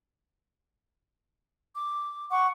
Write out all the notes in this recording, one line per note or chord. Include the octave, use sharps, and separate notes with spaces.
D6
F#5 C#6 D6